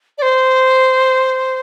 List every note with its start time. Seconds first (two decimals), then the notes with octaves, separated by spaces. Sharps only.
0.18 D5
0.22 C5